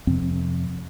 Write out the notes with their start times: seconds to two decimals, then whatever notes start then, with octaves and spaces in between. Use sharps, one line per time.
0.07 F2 C3 C4